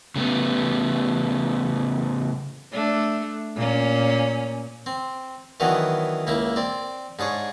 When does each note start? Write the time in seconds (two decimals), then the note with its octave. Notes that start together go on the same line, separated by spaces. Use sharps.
0.16 C#3 A3 B3
2.72 A3 D4
3.56 A#2 A#3 C#4
4.86 C4
5.60 D#3 E3 F#3 B3 D4
6.27 C#2 A#3 E4
6.56 C4 D5
7.19 G#2 D4 G#4 C#5